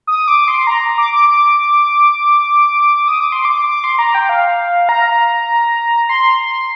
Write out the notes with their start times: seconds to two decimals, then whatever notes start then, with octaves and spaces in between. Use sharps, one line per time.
0.07 D#6
0.28 D6
0.48 C6
0.67 A#5
0.98 D6
1.13 D6
1.28 D6
3.08 D#6
3.20 D6
3.32 C6
3.45 D6
3.69 D6
3.84 C6
3.99 A#5
4.15 G5
4.29 F5
4.89 A#5
6.09 C6
6.40 C6